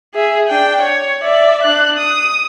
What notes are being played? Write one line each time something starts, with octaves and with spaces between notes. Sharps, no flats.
G#4 E5
D4 G5
C#5
D5 E5
D4 F#6
D#6